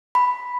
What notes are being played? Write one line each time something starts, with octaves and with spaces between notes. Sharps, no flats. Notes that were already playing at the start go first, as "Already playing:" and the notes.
B5